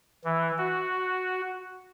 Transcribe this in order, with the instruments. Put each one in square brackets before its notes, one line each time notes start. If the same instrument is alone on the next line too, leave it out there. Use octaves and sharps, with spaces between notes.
[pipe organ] E3
F#4